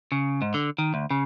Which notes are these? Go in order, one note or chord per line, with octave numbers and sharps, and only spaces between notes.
C#3
G#2
D3
D#3
D2
C#3